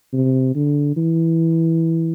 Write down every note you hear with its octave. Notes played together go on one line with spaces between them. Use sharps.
C3
D3
E3